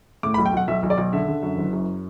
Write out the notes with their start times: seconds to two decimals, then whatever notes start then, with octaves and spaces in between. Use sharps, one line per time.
0.23 A2 D6
0.34 B5
0.38 B1
0.46 G5
0.53 B1 F#5
0.68 B1 E5
0.83 B1
0.90 D5
0.98 B1
1.13 D3 E5
1.28 D3
1.43 F#2
1.58 F#1
1.73 F#2